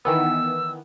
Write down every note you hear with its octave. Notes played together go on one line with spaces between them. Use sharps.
D#3 E3 B3 E6